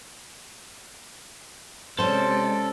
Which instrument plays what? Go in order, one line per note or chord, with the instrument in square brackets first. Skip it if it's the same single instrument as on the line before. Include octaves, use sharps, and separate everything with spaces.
[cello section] C3 G#3 D5 [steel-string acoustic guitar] C#4 C5 [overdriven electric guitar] A4